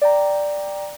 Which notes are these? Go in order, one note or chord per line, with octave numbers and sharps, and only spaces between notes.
D5 G5 A#5